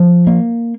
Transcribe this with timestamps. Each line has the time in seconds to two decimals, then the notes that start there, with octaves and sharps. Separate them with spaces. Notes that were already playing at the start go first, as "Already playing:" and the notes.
Already playing: F3
0.27 A#3